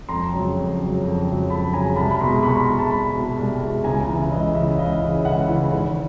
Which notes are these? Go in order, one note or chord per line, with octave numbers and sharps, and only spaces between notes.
F2 A#5 C6
C#3 F#3
F2
C#3 F#3
F2
C#3 F#3
F2 A5 B5
C#3 F#3 G#5 A#5
C2 A5 B5
B5
B2 G#3 A#5 C6
C2 B5 C#6
A#5 C6
B2 G#3
A5 B5
C2 A5 B5
B2 G#3
C2
B2 G#3
C#2 G#5 A#5
C#3 E3
E5
C#2 D#5
C#3 E3 E5
C#2 D#5 F5
C#3 E3
C#2 E5 F#5
C#3 E3
G#1